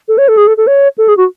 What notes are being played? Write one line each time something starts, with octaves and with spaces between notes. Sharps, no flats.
A4
C#5
A4
G#4
A4
A4
C#5
A4
G#4
F#4